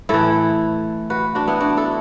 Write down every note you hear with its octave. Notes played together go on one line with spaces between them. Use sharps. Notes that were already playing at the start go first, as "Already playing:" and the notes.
A2 E3 E4 A4
F#4 B4
D4 F#4
B3 E4
D4 F#4
E4 A4